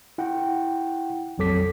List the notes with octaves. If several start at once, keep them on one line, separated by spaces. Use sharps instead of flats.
E4 F#5 G5
A#1 F2 F#3 A4 D6 B6